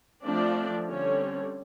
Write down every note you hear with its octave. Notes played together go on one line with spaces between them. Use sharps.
F3 A3 C4 D4 D5
D3 G3 C4 C#4 C#5